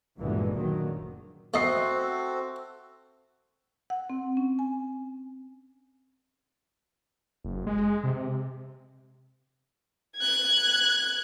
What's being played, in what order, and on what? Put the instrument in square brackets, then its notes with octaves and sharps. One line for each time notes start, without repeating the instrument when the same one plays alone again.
[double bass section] G1 D2 A#2 D3 E3 G#3
F#1 A#2 D3 D#3 F#3
[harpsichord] A3 D#5 [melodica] C4 F#4 A4 [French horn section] C5 [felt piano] E5 C7
[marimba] F#5
C4
C#4
G#5
[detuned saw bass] F#1
G#3
C3
[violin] F#6 G#6